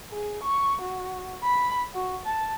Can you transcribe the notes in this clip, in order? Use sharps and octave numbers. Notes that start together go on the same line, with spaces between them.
G#4
C#6
F#4
B5
F#4
A5